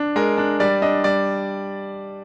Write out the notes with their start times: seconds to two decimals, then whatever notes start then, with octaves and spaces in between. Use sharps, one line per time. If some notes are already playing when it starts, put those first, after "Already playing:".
Already playing: D4
0.16 G#3 A#4
0.38 D4
0.60 G3 D5
0.82 D4 D#5
1.04 G3 D5